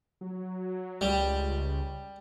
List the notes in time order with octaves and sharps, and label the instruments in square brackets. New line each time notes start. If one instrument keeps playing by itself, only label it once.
[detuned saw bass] F#3
[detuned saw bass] C#2 [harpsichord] G3